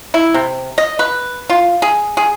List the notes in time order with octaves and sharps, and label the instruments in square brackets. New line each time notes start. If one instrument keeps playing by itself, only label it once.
[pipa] E4
C3
D#5
B4
F4
G#4
G#4